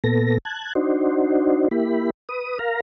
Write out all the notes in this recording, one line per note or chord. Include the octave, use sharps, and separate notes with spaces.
A#2 B3 A4 A#6
A5 F#6 G#6
D4 D#4 F#4 C5
A#3 E4 G4 B5
B4 D#6
A#4 F5 A#5